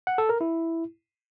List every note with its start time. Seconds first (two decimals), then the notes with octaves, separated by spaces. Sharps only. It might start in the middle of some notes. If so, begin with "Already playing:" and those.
0.07 F#5
0.18 A4
0.29 A#4
0.41 E4